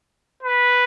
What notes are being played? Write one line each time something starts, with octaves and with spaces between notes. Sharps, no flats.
B4